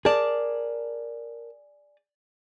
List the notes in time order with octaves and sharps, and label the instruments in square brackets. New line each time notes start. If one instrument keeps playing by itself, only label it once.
[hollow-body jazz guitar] G#4 D5 [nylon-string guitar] A#4 A5